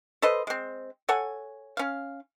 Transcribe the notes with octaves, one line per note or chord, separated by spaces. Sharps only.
A4 B4 C5 D#5
G#3 C4
A4 C#5 F#5 G#5
C#4 F5